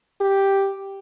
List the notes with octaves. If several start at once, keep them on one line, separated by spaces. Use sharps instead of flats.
G4